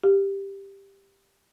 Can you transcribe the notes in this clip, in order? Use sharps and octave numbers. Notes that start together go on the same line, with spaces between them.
G4